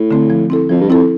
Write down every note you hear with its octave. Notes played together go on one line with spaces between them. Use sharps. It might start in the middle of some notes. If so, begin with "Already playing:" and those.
Already playing: A2
D3 A3 C4
F3
C4 E4 A4
F2 F3
G2
F2 C4 E4 A4